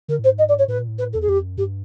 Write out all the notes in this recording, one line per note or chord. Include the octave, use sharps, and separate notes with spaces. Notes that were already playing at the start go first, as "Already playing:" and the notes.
D3 A#4
A2
C5
G#2
D#5
D5
C#5
A2 B4
A#2
A2
B4
E2 A4
G#4
F2 G4
F#2
G2 G4